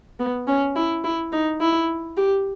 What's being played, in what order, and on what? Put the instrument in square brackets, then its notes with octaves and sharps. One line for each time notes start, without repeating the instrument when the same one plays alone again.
[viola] B3
C#4
E4
E4
D#4
E4
G4